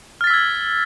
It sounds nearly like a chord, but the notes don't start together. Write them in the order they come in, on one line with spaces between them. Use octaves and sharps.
F6 A6 B6 E6 G#6